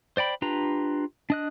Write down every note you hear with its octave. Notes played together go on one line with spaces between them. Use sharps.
C5 D5 G5 B5
D4 F4 G4 B4 A#5
D4 D#5 F#6